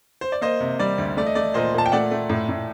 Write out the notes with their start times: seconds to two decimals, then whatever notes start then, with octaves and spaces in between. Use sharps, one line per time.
0.21 C5
0.32 D5
0.41 A#3 C5 D#5
0.60 C3
0.80 G3 D5
0.98 D2
1.17 A3 D5
1.26 D#5
1.35 A3 D5
1.54 A#2 C5 D#5
1.74 A#2 A5
1.86 G5
1.92 A3 D5 F#5
2.11 A3
2.30 A2
2.49 A2